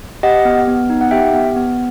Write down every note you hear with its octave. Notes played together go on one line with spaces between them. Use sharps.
G4 D#5 F#5
B3
B3
D#4
F#5
G4 E5 G5
B3
B3